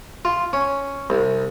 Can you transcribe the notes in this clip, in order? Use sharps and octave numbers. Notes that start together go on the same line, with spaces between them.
F4
C#4
C2